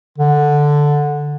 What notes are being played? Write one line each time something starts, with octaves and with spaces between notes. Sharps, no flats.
D3